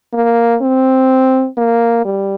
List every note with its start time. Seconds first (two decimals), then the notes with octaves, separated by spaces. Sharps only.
0.13 A#3
0.62 C4
1.57 A#3
2.05 G3